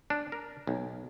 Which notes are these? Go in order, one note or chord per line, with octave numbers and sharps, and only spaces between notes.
D4
A#4
B1